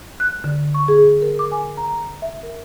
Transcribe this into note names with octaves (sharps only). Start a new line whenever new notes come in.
F#6
D3
C#6
G#4
A#4
D6
G#5
A#5
E5
A#4